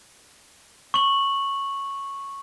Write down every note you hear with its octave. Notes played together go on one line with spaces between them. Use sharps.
C#6 F#7